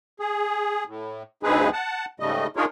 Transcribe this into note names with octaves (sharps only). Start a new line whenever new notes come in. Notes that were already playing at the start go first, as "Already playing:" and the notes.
G#4
A2
D2 G2 C4 D#4 G#4 B4
F#5 A5
G#2 C#3 G3 A3 D#5
D4 D#4 F4 G#4 A#4 C#5